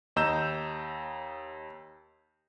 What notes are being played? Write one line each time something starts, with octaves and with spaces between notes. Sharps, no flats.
D#2 D#5 A#5 E6 G6 E7